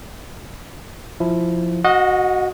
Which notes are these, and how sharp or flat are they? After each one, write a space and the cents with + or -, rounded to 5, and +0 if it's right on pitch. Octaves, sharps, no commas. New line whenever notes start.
F3 +0 E4 +0
F#4 +0 D#5 +0 F#5 -40